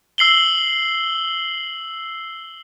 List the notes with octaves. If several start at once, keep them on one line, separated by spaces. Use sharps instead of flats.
E6 C7 F#7 G7